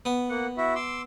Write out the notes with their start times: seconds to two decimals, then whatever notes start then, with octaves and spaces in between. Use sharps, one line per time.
0.05 B3
0.29 A#3 F#5
0.57 E4 F#4 E5
0.75 C6 D6 E6